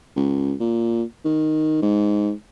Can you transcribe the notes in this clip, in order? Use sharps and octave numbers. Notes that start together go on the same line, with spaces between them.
C#2
A#2
D#3
G#2